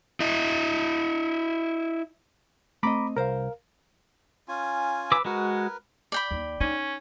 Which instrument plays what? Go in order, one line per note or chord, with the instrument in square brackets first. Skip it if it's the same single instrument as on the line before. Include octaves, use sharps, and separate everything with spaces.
[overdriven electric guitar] E4 D#5
[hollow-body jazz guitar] A3 C4 D#5 [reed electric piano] A#5 B5 D6
[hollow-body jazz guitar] C2 C5 [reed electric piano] A#4 F5
[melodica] C#4 F4 G#5
[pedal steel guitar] B4 D6 E6
[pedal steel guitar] G#3 F#4 [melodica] A#4 B4
[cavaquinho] D5 G5 B5
[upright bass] D#2
[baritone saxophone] C#4 [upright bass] D#4